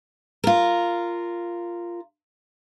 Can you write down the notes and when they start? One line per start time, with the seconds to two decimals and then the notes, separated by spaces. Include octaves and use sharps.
0.44 F4 A#4